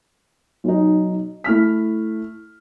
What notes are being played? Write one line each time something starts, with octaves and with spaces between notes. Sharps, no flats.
B1 D#4
A3 E4 F6 B6